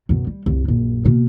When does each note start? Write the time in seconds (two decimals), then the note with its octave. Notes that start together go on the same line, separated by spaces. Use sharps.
0.09 F#2 B2
0.27 G3
0.46 C2 F#2
0.68 A#1 F#2
1.05 B2 A#3